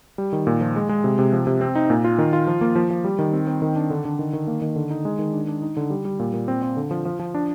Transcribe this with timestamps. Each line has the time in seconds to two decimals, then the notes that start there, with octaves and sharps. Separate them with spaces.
0.18 G3
0.33 D#3
0.47 A#2
0.61 F3
0.76 G#3
0.89 G#3
1.04 C3
1.19 C3
1.33 F3
1.47 C3
1.61 C4
1.75 D#4
1.90 A#2
2.04 F4
2.18 D#3
2.33 F4
2.47 F3
2.61 A#3
2.76 F3
2.90 F3
3.04 G3
3.19 D#3
3.33 C4
3.47 C4
3.62 D#3
3.76 D4
3.90 D3
4.05 D3
4.19 D#3
4.33 D#3
4.47 A#3
4.62 D#3
4.76 D3
4.90 D#4
5.05 G#3
5.19 D#3
5.33 D4
5.48 D4
5.62 D#4
5.77 D3
5.90 G3
6.05 G3
6.20 A#2
6.34 A#2
6.48 C4
6.63 C4
6.77 D3
6.91 F3
7.05 F3
7.20 F3
7.34 D4